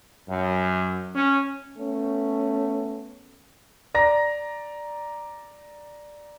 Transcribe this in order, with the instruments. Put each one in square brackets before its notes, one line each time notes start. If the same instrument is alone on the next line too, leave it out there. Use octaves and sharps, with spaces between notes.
[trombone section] F#2
C#4
[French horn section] A3 B3 C#4
[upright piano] D5 A#5 A#6